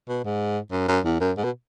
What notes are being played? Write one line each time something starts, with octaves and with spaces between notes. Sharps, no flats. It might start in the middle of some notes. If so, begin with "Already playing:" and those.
B2
G#2
F#2
F#2
E2
F#2
G#2
B2